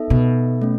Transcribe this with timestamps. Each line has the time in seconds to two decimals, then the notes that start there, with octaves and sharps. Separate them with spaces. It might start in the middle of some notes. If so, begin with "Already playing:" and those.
Already playing: B3 D#4 A4 E5
0.10 B2
0.62 A3 C#4